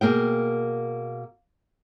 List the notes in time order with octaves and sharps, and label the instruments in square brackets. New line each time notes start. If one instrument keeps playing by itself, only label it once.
[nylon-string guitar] B2 A#3 G#4 G5